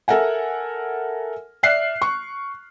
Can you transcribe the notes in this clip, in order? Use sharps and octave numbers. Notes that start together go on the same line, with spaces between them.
A4 A#4 E5 F#5 G#5
D5 E5 F6 F#6 C7
C#6